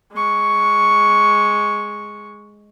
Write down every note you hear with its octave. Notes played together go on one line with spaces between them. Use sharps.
G#3 C#6